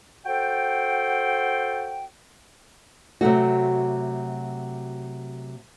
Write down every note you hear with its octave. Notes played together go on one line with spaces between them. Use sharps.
F#4 A4 C5 G5
C3 F#3 A3 F#4